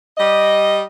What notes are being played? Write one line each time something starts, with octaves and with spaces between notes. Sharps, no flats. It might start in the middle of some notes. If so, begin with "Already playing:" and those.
G3 D#5